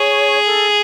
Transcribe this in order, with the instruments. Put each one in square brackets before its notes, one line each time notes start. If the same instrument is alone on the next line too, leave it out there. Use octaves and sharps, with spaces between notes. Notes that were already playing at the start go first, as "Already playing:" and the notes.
Already playing: [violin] G#4 [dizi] C#5
[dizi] A4